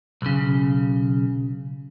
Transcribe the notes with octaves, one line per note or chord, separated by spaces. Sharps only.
B1 C#3